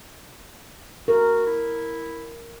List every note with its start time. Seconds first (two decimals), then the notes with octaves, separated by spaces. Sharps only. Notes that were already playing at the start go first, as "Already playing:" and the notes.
1.08 F#4 A#4
1.47 E4